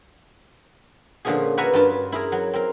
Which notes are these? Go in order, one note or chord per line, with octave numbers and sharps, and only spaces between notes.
A#2 D3 F3 C#4 G#4
F#4 A#4 B4 C#5 E5 G#5
G2 F4 A5
E4 G#4 A#4
F#3
C4 A#4